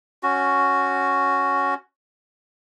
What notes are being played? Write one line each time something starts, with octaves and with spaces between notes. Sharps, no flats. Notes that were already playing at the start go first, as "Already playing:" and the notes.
C#4 F#4